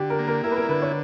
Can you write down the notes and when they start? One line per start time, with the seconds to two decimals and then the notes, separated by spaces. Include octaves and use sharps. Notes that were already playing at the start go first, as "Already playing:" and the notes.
Already playing: D3 G4
0.10 A#4
0.19 A#3
0.28 A#4
0.44 E4 A#4
0.51 B4
0.57 A#4
0.69 D3 B4
0.82 C#5